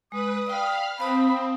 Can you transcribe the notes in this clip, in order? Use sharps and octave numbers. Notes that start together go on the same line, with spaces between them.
G#3 B4 D#6
D5 F5 G5 B5 F6
C4 F5 A5 B5 D#6